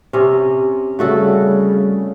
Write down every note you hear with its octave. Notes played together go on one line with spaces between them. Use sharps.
C3 C#4
C#3 G3 A3 F#4 A4